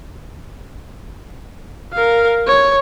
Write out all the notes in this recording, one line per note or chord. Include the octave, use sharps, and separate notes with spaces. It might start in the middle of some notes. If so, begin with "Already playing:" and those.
A#4 F5
C#5